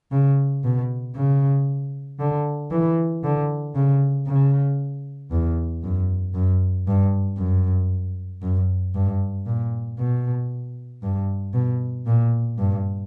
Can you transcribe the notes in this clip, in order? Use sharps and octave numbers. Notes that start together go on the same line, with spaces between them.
C#3
B2
C#3
D3
E3
D3
C#3
C#3
E2
F#2
F#2
G2
F#2
F#2
G2
A#2
B2
G2
B2
A#2
G2